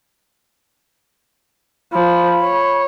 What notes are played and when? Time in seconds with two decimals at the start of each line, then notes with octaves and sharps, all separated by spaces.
1.93 F3 B5
2.42 C#5